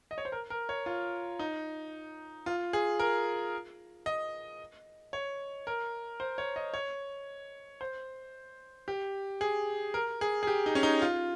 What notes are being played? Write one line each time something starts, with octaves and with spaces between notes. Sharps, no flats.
D#5
C#5
C5
A#4
A#4
C#5
F4
D#4
F4
G#4
A#4
D#5
C#5
A#4
C5
C#5
D#5
C#5
C5
G4
G#4
A#4
G#4
G#4
G4
D#4
C#4
D#4
F4